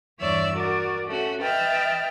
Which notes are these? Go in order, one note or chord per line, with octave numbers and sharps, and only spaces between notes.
E2 G2 C#5 D5 E5 E6
F#4 A#4 D5
A3 C#4 F#4
B4 D#5 E5 G5 F6 A6